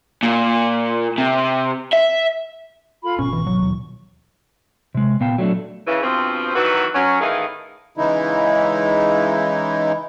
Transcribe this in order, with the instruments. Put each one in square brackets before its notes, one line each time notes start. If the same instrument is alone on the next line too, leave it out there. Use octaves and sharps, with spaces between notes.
[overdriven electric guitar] A#2
C3
E5
[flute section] F4 A4 B5
[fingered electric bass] G#1 B2 B3 [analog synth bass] C#4 [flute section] C#6
[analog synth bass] E3
F#3
[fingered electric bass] D#2 B2 E3
[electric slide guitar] C3 G#3
A#2 B3 F5 G5 A5
F#3 A3 D4 A4
[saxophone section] C#3 E3
G2 B2 F3 C4
D#3 E3 F#3 F#4 B4
F#3 C#4
A2 D#3 E3 D#4 G#4 F5
[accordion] C#3 E3 G#3 D#4 E4